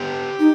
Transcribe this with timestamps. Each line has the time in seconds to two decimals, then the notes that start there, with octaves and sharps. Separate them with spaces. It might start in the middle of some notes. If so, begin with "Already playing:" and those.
Already playing: B3 G4
0.39 D#4